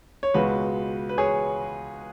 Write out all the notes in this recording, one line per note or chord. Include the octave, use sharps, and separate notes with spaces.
C#5
C#2 B2 G#3 F#4 B4
B4
G#4 C#5